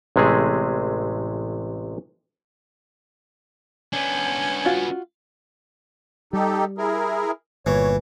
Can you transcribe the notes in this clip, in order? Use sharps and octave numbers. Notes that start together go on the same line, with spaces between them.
A1 C3 G#3 A3 G#4
B3 C#4 D4
F4 F#4
G3 D#4 G4 A4
E4 G#4 A#4
G1 A#2 E3 C#5